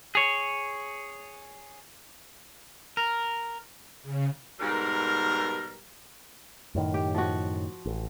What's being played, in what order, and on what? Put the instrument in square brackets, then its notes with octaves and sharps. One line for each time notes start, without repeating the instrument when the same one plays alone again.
[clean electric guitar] G#4 C#5
A#4
[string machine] C#3
[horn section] G#2 B2 G3 A#4
[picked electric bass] F#2 A2 D#3
[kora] G4
F3 F#4
[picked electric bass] A1